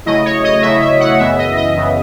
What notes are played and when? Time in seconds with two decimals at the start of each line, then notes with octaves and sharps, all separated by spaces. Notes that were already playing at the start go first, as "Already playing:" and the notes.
0.06 C#3 F#3 A3 E4 D#5
0.25 C#5
0.44 D#5
0.62 C#3 F#3 A3 E4 E5
0.81 E5
1.00 F#5
1.19 F#2 C#3 E3 B3 E5
1.38 D#5
1.57 D#5
1.76 F#2 C#3 E3 B3